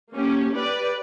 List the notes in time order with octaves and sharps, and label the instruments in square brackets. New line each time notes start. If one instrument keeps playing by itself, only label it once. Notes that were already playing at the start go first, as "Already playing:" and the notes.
[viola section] A#3 C#4 G4
G4 B4 D5